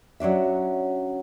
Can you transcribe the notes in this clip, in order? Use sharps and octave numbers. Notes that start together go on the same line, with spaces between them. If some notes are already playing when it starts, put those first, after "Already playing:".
F#3 C#4 D4 E5